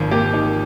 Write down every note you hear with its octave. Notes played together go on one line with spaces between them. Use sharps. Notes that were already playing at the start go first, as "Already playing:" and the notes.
Already playing: G#1 F3
A#3 G4
D#4